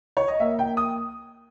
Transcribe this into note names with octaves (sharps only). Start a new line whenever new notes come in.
C#5
D#5
A#3 E5
G5
A#3
D#6